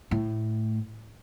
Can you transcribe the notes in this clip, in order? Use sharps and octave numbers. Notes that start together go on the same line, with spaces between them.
A2